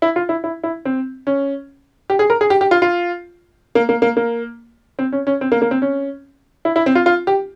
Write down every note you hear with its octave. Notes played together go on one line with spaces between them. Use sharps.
E4
F4
E4
E4
E4
C4
C#4
G4
G#4
A#4
G#4
G4
G4
F4
F4
A#3
A#3
A#3
A#3
C4
C#4
C#4
C4
A#3
A#3
C4
C#4
E4
E4
C4
F4
F4
G4